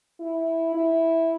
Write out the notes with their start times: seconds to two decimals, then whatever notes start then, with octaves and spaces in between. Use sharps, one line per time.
0.20 E4
0.74 E4